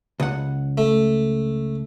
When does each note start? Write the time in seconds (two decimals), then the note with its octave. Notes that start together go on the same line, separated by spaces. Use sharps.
0.20 C#2 F#5
0.78 A3